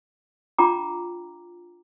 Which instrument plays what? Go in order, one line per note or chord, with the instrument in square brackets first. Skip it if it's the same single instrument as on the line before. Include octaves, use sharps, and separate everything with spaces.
[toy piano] D4 F4 F5 G5 A#5 D6